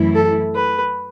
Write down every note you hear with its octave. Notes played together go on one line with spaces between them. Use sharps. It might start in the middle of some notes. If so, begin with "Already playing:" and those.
Already playing: F#2 E3 A3 E4
A4
B4